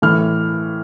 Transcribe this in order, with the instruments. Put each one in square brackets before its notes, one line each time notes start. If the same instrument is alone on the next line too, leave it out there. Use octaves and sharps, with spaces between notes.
[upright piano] A2 E3 A3 F6